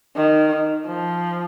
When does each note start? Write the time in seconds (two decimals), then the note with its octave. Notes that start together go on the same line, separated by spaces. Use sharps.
0.16 D#3
0.86 F3